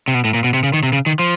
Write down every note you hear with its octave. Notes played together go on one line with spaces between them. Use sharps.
C3
B2
A2
A#2
B2
C3
C#3
D#3
C3
C#3
D#3
F3